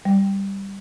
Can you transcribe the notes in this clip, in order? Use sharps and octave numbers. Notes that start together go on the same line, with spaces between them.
G3